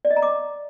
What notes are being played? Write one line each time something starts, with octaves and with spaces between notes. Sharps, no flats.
D5
D#5
A#5
D6